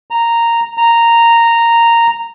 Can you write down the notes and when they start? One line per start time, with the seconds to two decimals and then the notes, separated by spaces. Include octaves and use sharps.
0.11 A#5
0.78 A#5